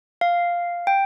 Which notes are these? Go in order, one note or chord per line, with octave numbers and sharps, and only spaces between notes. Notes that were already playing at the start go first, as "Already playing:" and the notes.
F5
G5